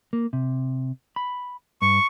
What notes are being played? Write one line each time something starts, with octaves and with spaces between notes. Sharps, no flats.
A#3
C3
B5
G2 C#6